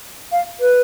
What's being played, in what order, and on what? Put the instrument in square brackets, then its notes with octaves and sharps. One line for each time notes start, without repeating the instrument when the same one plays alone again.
[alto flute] F5
B4